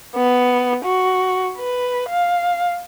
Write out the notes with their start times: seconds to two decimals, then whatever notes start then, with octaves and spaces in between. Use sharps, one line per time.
0.16 B3
0.84 F#4
1.58 B4
2.09 F5